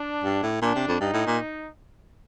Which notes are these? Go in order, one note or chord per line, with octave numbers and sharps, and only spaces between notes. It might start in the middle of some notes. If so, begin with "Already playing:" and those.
Already playing: D4
G2
A2
A#2 D4
C3
F2
G2 D#4
A2
A#2